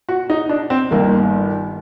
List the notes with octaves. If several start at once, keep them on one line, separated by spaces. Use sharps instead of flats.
F#4
D#4
D4
C4
G1 G2 D#3 A#3